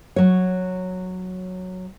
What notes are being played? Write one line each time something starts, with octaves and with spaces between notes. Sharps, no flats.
F#3 C#5